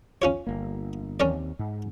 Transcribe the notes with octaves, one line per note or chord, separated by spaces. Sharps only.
C#4 F4 C#5
G1 A#3
D#2 C4 C#4 A#4 D5
G#2